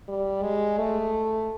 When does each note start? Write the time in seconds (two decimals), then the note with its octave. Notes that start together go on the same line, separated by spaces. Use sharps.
0.08 G3
0.43 G#3
0.78 A3